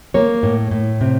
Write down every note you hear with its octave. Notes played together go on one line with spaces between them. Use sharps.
A#3 C#5
A2
A2
C3